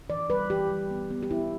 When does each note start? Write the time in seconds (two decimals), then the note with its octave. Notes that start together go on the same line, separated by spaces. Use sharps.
0.10 E3 D5
0.30 G3 B4
0.50 E3 G4
0.70 G3
0.90 B3
1.11 B3
1.23 G4
1.31 B3 E4